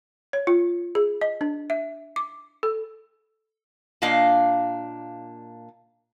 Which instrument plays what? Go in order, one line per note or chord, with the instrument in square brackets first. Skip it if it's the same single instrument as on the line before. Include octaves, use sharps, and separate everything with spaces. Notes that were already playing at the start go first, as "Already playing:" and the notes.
[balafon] C#5
F4
G#4
D#5
D4
E5
D6
A4
[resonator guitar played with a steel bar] A#2 A#3 D4 D#5 F5